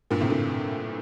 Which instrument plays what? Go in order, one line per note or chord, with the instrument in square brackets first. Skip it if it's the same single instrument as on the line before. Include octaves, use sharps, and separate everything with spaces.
[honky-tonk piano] G2 A#2
A2 C3
A#2 D3